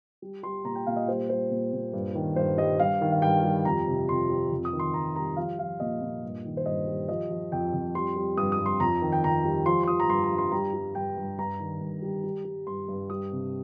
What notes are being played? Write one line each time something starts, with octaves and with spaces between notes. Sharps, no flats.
G3
G3 C6
A#2 A#5
G5
A#2 F5
D#5
G3 C5
G3 C5
A#2
A#2
G2
D#3
G2 C5
G3 D#5
G2 F5
D#3
F5
G2 G5
G3
F2 A#5
C3
F2 C6
G3
F2
D#6
D#3
C6
F2 A#5
G3 A#5
F3 F5
F3 F5
A#2 D#5
A#2
G2
D#3
C5
G2 D#5
G3
F3 D#5
F3
F2 G5
F2
G3 C6
G3
G2 D#6
D#6
G2
C6
F2 A#5
D#3
G5
F2 A#5
G3
F3 C6
C6
F3 D#6
A#5
G2 C6
A#5
G2
C6
G3 A#5
G3
G2 G5
G2
G2 A#5
D#3
G2
G3
G3
G3
G2 C6
G2
G3 D#6
C3